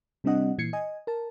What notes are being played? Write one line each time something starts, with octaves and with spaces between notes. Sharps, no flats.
C3 G3 C4 D4 D#5 F#5
A#2 E3 G#6 C7 C#7
D#5 G#5
A#4 A5